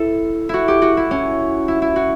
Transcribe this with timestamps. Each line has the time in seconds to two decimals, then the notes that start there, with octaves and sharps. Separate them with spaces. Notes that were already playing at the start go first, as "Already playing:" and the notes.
Already playing: E4 A4
0.49 E4 F#4
0.68 G4
0.82 F#4
0.97 E4
1.11 C#4
1.68 E4
1.82 E4
1.96 F#4